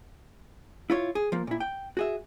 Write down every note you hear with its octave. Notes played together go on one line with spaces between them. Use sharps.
E4 F4 C#5
G#4
F3 A#3
A#2 E4
G5
F#4 G#4 E5